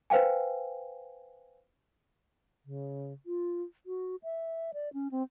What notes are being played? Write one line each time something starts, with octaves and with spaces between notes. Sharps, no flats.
B4 C5 F5 G5 G#5
C#3
F4
F#4
E5
D5
C#4
C4